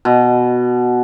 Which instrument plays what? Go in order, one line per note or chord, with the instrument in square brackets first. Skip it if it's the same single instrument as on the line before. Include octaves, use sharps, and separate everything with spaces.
[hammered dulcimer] B2